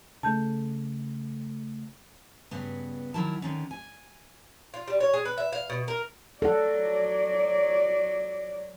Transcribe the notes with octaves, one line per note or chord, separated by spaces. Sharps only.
C#3 A3 A5 G6
G2 C#3 B3
D#3 E3 F#3 E4 A#4 A5
D3 D#3 C#4
G#5
F4
G3
C#5
G#4
B4
E5
F5
B2
A#4
F#3 A4 D5 F#5